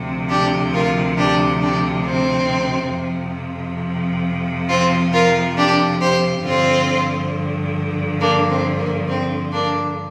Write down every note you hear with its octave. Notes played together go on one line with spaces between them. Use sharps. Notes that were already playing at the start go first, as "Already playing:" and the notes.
Already playing: D2 C3 F3
D4 G4
F4 A#4
D4 G4
D4 G4
C4
F2 C3 F3
C4 F4
F4 A#4
D4 G4
G4 C5
G2 D3 F3 C4 F4
A#3 D4
C4
A#3
C4
A#3 D4